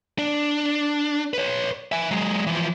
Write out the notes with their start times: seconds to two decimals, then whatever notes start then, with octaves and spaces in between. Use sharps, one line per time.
0.19 D4
1.33 B4 C#5
1.92 E5 G#5
2.11 F#3 G#3
2.47 E3 F3